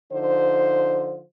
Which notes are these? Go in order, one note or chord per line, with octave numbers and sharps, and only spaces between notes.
D3 F3 D#4 C5